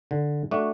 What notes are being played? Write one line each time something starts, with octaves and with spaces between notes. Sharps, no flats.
D3
A3 D4 F#4